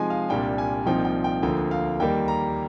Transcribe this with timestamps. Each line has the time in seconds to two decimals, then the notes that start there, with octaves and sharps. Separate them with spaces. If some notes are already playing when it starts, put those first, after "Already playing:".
Already playing: C3 F3 G#3 D#4 G#5 C6
0.10 F5
0.29 C2 A#2 G3 D4 G5
0.58 G#5
0.86 C2 A#2 F3 C4 D#4 G5
1.05 G5
1.24 G5
1.43 D2 D3 F3 A#3 G5
1.71 F5
2.00 D#2 D#3 G3 A#3 G5
2.28 A#5